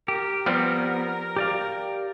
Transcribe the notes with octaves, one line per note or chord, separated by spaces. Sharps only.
G4 A#4
F3 G3 B3 C4
G4 D5 F5